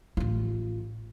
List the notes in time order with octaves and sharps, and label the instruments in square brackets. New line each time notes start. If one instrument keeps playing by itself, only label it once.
[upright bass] A1 F4